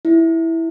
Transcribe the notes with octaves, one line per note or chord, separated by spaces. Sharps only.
E4